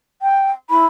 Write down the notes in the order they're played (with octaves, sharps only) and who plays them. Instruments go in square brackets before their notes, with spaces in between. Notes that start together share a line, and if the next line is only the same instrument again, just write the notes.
[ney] G5
[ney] E4 [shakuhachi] B5